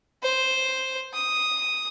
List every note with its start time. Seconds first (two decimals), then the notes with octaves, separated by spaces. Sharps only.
0.23 C5
1.14 D#6